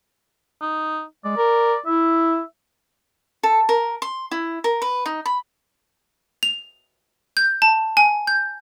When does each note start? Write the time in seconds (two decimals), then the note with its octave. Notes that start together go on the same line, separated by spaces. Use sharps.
0.61 D#4
1.25 G#3 D5
1.37 A#4
1.86 E4 E5
3.43 A4
3.69 A#4
4.02 C6
4.31 E4
4.64 A#4
4.82 B4
5.06 D#4
5.26 B5
6.43 F7
7.37 G6
7.62 A5
7.97 G#5
8.27 G6